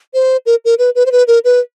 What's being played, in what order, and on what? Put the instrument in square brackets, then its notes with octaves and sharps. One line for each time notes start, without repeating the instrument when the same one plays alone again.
[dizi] C5
A#4
A#4
B4
B4
C5
B4
A#4
B4